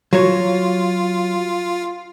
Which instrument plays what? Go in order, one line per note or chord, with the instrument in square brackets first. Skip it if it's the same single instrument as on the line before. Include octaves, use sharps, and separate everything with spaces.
[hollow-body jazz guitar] F#3 C#5 [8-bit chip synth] F4